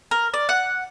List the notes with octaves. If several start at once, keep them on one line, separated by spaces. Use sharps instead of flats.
A#4
D5
F#5